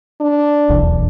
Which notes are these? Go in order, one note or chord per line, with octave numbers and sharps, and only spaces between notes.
D4
D#1 B1 E2